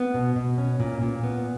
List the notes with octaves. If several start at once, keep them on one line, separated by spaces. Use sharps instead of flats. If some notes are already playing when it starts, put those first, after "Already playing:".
Already playing: B3
B2
B2
C#4
A#2
A#2
B3